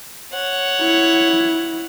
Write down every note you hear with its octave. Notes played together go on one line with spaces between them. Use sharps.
C#5 F#5
E4